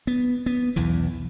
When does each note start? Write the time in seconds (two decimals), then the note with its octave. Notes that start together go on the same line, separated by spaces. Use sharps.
0.07 B3
0.46 B3
0.76 B1 E2 E3